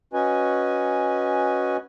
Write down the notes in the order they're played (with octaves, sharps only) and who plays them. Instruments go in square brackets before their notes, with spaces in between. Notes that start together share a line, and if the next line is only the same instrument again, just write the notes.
[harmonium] C#4 F#4 B4 D#5 G#5